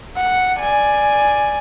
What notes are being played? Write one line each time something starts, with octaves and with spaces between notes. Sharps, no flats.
F#5
D5 G#5